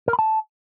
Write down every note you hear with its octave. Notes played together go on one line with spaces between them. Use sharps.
A#4
B5
A5